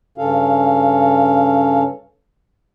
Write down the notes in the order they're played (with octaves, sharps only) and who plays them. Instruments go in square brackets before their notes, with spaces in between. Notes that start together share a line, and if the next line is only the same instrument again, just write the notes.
[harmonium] G2 C#3 C#4 A4 F5